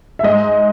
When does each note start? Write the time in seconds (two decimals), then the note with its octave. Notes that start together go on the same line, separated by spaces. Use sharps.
0.19 E5
0.23 G#2 D#5